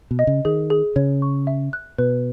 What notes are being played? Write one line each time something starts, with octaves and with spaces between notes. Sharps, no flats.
B2
D#5
C#3
D#3 G#4
G#4
C#3 C#5
C#6
E5
F#6
B2 B4